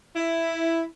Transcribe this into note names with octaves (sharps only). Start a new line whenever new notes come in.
E4